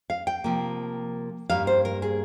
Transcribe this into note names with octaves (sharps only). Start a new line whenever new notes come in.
F5
G5
C3 F3 A#3
G2 G3 A#3 F5
C5
A#4
G#4